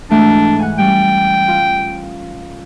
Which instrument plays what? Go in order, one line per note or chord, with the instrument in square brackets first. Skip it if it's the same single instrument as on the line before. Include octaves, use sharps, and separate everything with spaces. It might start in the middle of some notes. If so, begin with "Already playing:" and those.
[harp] G#2 E3 A3 [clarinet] D4
[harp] F#5 G#5
[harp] G3 C#4 [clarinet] G5
[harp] F4